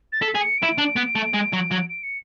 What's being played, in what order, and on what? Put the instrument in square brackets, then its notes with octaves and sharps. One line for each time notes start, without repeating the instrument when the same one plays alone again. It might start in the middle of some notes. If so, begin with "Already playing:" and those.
[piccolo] A6
[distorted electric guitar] A4 [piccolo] B6
[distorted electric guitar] G#4
[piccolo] C#7
[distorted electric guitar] E4 [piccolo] D7
[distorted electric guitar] D4
B3
A3
G#3
F#3
F#3
[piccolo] D7
C#7